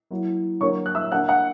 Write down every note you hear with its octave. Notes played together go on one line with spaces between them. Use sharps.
F#3 A#3 E4
D3 F#3 A#3 C#5 C#6
F#6
E5 E6
D3 A#3 D4 F#5 F#6
F#5 F#6